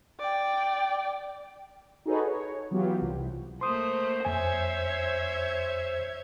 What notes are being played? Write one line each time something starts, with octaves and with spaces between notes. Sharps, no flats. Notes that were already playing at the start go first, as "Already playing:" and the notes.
D5 G5
D#4 F#4 G#4 A4 B4 C#5
C#5
E3 F#3 B3 F4 G4
C2
A3 A#3 C5 C6 D#6
F2 C#5 E5 G#5 G#6